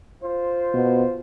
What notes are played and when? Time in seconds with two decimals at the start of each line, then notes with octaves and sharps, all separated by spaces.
0.22 F4 C5
0.74 B2